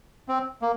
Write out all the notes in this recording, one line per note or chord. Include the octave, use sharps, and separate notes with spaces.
C4
A#3